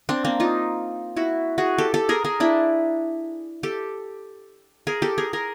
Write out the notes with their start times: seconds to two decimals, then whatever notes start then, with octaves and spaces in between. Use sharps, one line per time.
0.09 C4 D4
0.25 A#3 C4
0.40 D#4 F4
1.17 E4 F#4
1.58 F#4 G#4
1.78 G4 A4
1.94 G4 A4
2.09 G#4 A#4
2.24 G#4 A#4
2.40 D4 E4
3.63 G4 A4
4.87 G#4 A#4
5.02 G4 A4
5.18 G#4 A#4
5.33 G#4 A#4